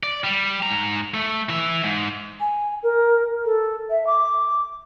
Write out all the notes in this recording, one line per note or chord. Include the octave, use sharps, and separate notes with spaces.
D5
G3
G#2 A#5
A3
E3 E5
G#2
G#5
A#4
A4
E5
D6